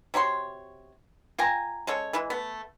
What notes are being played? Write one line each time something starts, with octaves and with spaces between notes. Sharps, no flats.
C3 F#4 C#5 C6
F4 G5 G#5 A#5
G#3 C#4 A4 C#5
E3 G#3 E4
A3 B3